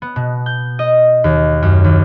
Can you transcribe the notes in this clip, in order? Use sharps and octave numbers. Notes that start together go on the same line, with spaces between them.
B3
B2
G6
D#5
D#2
F#2
D#2